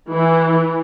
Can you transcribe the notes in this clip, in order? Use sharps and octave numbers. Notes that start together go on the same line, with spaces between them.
E3